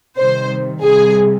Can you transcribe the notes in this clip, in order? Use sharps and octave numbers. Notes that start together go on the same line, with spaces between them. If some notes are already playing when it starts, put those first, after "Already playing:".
C3 D#3 G3 C5
C3 G3 G#4